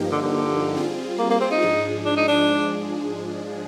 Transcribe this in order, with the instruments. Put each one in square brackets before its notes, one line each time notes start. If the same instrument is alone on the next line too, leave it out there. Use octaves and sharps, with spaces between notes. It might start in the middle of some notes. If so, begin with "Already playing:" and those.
Already playing: [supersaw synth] G2 F3 A#3 D#4 G4
[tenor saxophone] D3
D3
[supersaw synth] G3 C4 F4 G#4
[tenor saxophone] A#3
A#3
C4
D#4
[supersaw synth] G#2 F3 G#3 D4 G#4
[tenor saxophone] D4
D#4
D4